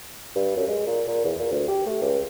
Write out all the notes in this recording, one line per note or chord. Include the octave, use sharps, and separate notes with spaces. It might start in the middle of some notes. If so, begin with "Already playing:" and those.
G2
F#2
G#3
A#2
A#2
E2
A#2
D2
G4
A3
C#2